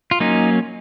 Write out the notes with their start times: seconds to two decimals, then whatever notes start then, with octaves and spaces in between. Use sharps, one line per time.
0.11 F4
0.20 F#3 A#3 C#4 D#4